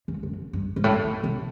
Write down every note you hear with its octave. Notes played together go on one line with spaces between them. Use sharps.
F#2
F#2
G2
G#2
A2
A#2
B2